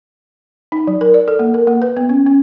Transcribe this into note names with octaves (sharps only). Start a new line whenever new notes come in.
D#4
F#3
A#4
D5
A4
A#3
A#4
A#3
B4
B3
C#4
C#4